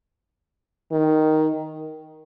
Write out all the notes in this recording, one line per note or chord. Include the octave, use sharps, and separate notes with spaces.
D#3